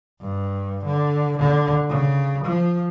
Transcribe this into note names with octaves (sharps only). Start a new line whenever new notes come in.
G2
D3
D3
C#3
F3